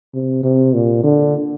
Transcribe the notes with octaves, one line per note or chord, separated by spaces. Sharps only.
C3
C3
A#2
D3